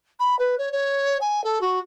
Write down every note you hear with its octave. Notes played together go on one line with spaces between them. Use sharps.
B5
B4
C#5
C#5
G#5
A4
F#4